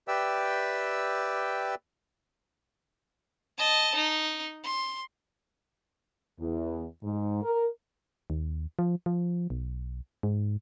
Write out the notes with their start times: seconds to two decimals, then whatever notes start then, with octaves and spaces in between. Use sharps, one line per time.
0.08 G4 B4 D5 E5 G5 E6
3.58 D#5 A5
3.95 D#4
4.64 C6
6.40 E2
7.03 G#2
7.43 A#4
8.30 D#2
8.79 F3
9.06 F3
9.50 B1
10.23 G#2